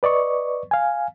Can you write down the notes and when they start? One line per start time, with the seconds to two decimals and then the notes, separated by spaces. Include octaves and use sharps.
0.03 B4 D5 D#5 C#6
0.71 F5 G#5